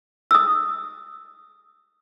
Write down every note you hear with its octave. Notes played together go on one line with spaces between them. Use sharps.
D#6 E6